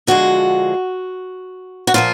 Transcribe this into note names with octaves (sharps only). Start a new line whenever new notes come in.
D3 F3 G#3 F#4
F#4
A#2 F3 A#3 F4